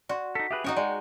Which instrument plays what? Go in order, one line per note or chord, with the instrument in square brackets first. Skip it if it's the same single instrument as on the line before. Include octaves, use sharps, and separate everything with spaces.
[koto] F#4 [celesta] D5 C6
[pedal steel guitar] D#4 A4 [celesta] B6
[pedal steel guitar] G4 G#4 B4 [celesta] E5 F#6
[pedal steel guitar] C#4 G5 D#6 [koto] D#4 F#4 C#5
[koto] G#3 [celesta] D5 [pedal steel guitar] F#5 G5